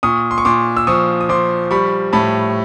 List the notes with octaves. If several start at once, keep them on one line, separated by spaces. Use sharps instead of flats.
A#2 C#6 D#6
C6
C#6
A#2 C6 D6
E6
F3 C#6 D#6
D#6
F3 C6 D6
G3 B5 C#6
A2 A5 B5